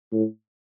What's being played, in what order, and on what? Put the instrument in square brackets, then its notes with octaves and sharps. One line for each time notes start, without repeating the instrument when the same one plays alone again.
[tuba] A2